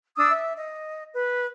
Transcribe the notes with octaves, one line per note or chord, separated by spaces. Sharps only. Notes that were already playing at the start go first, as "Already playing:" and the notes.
D4 D#6 E6
E5
D#5
B4